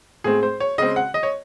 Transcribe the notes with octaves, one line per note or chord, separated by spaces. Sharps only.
A2 G#3 C4 G#4
C5
C#5
C#3 G#3 C4 D#5
F#5
D#5
C#5